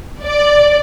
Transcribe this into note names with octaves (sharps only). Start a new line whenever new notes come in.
D5